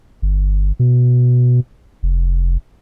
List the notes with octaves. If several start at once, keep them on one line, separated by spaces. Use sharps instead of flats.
G1
B2
F1